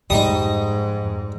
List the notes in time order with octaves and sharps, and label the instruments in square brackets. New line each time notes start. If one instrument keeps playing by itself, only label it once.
[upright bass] F2 [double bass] G#2 [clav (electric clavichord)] G3 [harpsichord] D#4 D#5 D#6